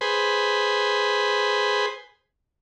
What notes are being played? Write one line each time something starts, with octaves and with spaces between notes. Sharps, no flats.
G#4 B4 C5